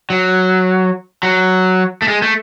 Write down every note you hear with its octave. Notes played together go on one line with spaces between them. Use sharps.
F#3
F#3
A3
G#3
A3